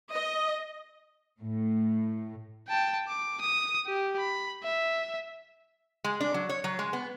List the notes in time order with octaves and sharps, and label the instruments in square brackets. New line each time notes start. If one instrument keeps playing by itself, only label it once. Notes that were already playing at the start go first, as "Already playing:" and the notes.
[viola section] D#5
[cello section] A2
[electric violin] G5 A5
D6
D#6
G4
B5
E5
[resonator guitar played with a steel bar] G#3
D4
F#3
C#5
F#3
G#3
B3